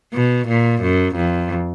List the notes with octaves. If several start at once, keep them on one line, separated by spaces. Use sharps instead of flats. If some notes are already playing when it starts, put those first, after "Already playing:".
B2
A#2
F#2
F2